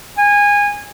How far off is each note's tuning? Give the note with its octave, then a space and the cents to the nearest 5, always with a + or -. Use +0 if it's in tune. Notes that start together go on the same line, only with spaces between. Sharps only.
G#5 -20